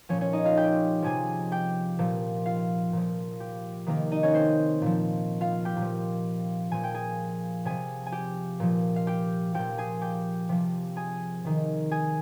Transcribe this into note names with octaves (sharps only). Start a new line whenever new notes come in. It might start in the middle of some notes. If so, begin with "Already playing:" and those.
A#2 F3 C#4 C#5
C#4 C#5
D#4 D#5
F4 F5
G4 G5
C3 F3 G#4 G#5
G4 G5
A#2 F3
F4 F5
A#2 F3
G4
C3 D#3 A#3 A#4
D#4 D#5
C#4 C#5
C4 C5
A#2 F3
F4 F5
G4 G5
A#2
F3
A#2 F3 G#5
G5
G#4 G#5
C3 F3 G#4 G#5
G#5
G4 G5
A#2 F3
F5
G4 G5
A#2 F3 G4 G5
G#4 G#5
G4 G5
C3 F3
G#4 G#5
C3 D#3
G#4 G#5